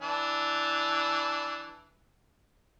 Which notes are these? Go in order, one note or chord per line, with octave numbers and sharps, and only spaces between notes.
E3 D4